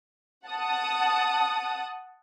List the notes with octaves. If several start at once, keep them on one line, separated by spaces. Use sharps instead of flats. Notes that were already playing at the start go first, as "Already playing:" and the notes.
F#5 A5 D#6